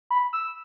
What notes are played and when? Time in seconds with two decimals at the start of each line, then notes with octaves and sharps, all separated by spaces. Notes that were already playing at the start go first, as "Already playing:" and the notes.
0.10 B5
0.33 E6